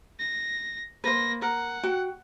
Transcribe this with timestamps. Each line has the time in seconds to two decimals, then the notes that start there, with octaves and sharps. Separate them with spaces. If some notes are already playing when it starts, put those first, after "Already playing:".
0.20 A#6
1.04 A#3 B4 C5 A#6
1.42 A#4 F#5
1.83 F#4 G5